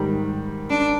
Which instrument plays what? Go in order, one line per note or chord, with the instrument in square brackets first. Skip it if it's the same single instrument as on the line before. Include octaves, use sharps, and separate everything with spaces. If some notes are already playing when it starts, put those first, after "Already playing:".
Already playing: [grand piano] G#2 D#3 G3
[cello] D4